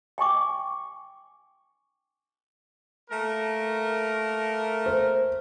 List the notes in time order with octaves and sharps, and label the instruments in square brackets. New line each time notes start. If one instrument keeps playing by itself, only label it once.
[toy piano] G5 G#5 C#6 D6
[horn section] A3 A#3 A#4
[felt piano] C5